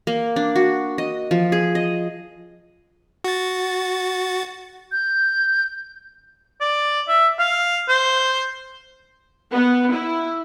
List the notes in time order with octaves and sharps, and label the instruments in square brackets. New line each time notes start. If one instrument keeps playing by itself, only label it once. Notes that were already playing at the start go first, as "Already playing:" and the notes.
[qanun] A#3
D4
F#4
D#5
F3
G#4
D#5
[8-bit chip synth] F#4 A6
[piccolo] G6
[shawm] D5
E5
F5
C5
[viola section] B3
E4